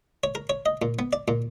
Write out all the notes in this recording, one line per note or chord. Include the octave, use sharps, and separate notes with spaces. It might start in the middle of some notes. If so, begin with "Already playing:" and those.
C#5
A#4
C#5
D#5
A#2
B3
D5
A#2